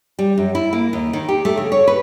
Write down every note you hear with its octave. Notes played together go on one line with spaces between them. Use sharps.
G3
F#2
E4
A#3
D#2
D#3
G4
A3
C#3
C#5
B4